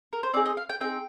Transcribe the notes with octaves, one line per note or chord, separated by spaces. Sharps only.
A#4
C5
C4 D#4 G#4 D5
D#5
F5
G5
C4 D#4 G#4 G5